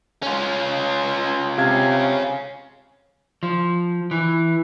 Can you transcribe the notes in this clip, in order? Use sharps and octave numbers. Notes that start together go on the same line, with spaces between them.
C#4 F4
C3 F5 G#6
F3
E3